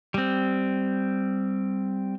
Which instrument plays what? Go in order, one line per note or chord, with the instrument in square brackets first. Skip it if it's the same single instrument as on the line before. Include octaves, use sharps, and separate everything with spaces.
[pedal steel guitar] G3 C4